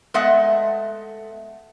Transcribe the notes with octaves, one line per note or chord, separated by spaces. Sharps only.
G#3 A3 B3 D#5 E5 F#5